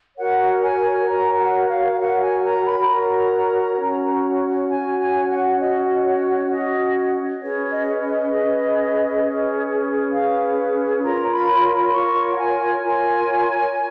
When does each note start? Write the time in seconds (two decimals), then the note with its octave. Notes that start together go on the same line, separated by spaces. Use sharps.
0.17 F#4 A#4 C#5 F#5
0.62 G#5
1.07 F#4 A#4 C#5 A#5
1.38 F#5
1.67 F5
1.94 F5
1.98 F#4 A#4 C#5 F#5
2.21 G#5
2.44 A#5
2.66 B5
2.88 F#4 A#4 C#5 A#5
3.79 C#4 F#4 C#5
4.69 C#4 F#4 C#5 G#5
4.99 G#5
5.30 F#5
5.60 C#4 F#4 C#5 D#5
6.05 C#5
6.50 C#4 F#4 C#5 D#5
7.41 C#4 G#4 B4 C#5
7.71 D#5
8.01 D#5
8.31 C#4 G#4 B4
9.21 C#4 G#4 B4
10.12 C#4 G#4 B4 F5
11.02 F4 A#4 C#5 A#5
11.33 B5
11.62 B5
11.92 F4 A#4 C#5 C#6
12.31 F#5
12.37 G#5
12.83 F4 A#4 C#5 G#5
13.73 C#5